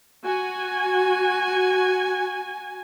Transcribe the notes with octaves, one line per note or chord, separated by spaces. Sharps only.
F#4 G#5